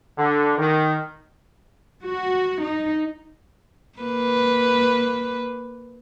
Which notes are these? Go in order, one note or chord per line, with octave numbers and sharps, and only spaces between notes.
D3
D#3
F#4
D#4
A#3 B4